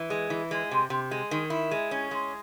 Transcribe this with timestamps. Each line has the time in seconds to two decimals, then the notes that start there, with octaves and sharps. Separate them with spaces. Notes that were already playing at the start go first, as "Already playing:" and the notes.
Already playing: E3
0.10 G#3
0.30 E3
0.51 G#3
0.71 C3
0.90 C3
1.11 G#3
1.31 D#3
1.50 E4
1.71 G#3
1.91 C#4
2.11 G#3